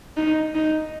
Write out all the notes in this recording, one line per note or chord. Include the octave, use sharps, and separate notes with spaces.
D#4
D#4